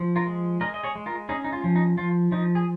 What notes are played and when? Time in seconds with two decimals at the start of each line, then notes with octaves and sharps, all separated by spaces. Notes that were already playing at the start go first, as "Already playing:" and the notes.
Already playing: F3
0.16 F4 A#4
0.27 G#3
0.61 G#3 A#4 D#5
0.74 D#5
0.84 G#4 C#5
0.95 G#3
1.06 F4 A#4
1.29 C#4 D#4 G#4
1.44 D#4
1.52 F4
1.64 F3
1.75 D#4
1.97 F3 F4
2.32 F3 D#4
2.55 G#4